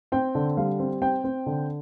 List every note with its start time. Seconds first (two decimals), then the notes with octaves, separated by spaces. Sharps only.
0.12 C4 G5
0.35 D3
0.57 G3 F5
0.79 C4
1.02 C4 G5
1.24 C4
1.46 D3